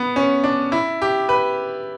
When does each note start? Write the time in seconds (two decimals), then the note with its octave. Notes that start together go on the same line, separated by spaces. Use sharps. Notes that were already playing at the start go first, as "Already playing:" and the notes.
Already playing: B3
0.16 C#4
0.44 D4
0.72 E4
1.02 G4
1.29 B4